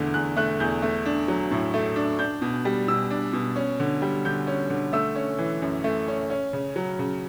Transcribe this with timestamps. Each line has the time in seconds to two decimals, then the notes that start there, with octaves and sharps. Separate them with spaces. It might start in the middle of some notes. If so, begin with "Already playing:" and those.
Already playing: E2 D3 A3
0.14 E2 F#6
0.37 A3 F#6
0.60 E2 G6
0.82 A3
1.06 D4
1.28 F#3
1.52 A2
1.74 A3
1.96 D4
2.19 D4 G6
2.42 B2
2.65 G3
2.88 B2 E6
3.10 D4
3.33 B2
3.56 C#4
3.80 D3
4.02 G3
4.25 D3 G6
4.47 C#4
4.70 D3
4.93 A3 E6
5.15 C#4
5.38 E3
5.62 F#2
5.84 A3
6.08 C#4
6.30 C#4
6.53 C#3
6.76 F#3
6.99 C#3